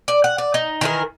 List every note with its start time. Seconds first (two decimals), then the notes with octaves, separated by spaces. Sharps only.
0.08 D5
0.24 F#5
0.38 D5
0.54 D#4
0.81 D#3 E3 A#4